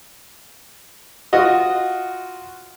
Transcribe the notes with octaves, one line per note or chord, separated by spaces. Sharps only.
F4 F#4 D#5